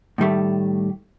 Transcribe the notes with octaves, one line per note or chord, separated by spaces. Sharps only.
A2 D#3 G3 A3